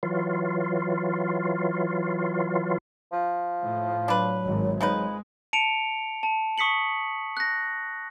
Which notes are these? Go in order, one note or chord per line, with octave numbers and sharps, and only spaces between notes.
E3 F#3 F4
F3
A2
F#3 D4 B4
G#1 G#2
F3 G#3 D#4 B4
A5 C#7 D7 F7
A5
C#6 D#6 B6 C#7 F#7
F#6 A#6